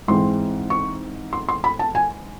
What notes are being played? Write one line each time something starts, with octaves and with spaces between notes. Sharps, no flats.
G#2 E3 G#3 C4 C6
C#6
C6
C6
B5
A5
G#5